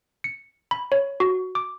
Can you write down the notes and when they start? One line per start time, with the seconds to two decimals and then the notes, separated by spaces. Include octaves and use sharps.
0.24 C#7
0.71 B5
0.92 C#5
1.20 F#4
1.55 D6